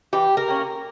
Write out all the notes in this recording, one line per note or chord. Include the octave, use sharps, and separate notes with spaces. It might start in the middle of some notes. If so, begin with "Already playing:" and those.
E3 G4
A#4
A#3 C#4